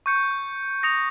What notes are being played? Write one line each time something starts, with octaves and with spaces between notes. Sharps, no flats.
C#6 G6 C#7
D#6 A#6 C#7 F7